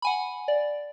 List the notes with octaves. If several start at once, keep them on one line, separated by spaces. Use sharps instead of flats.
F#5 G#5 B5
D5